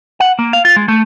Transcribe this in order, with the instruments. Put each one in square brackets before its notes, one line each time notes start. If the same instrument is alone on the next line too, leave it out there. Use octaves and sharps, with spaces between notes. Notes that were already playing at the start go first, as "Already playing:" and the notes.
[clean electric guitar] F#5
A#3
F5
F4
G#3
A3